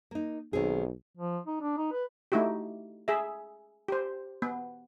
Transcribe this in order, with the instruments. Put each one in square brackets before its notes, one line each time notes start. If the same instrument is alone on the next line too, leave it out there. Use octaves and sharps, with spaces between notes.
[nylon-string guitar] A#3 D#4
[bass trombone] B1 [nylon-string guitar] D#3 C4 G#4
[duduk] F3
D#4
D4
D#4
B4
[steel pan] A3 D#4 E4 F#4 G4
G#4 E5
G4 C5
B3